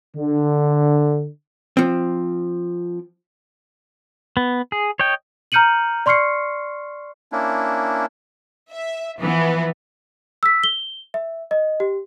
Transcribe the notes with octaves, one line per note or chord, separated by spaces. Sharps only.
D3
F3 C4
B3
G#4
C#5 D#5 G5
A#5 F6 G6 C#7 D#7 F#7
D5 C6 C#6 F6 C7 C#7
A#3 C#4 D4 E4
E5
E3 F3 B3
E6 B6
G7
E5
D#5
G4